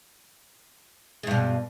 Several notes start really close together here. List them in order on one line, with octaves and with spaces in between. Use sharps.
G#3 G2 B2